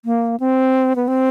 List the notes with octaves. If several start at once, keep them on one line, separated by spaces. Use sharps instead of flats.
A#3
C4
B3
C4